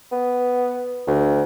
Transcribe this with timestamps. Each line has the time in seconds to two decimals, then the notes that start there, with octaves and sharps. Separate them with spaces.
0.12 B3
1.07 D2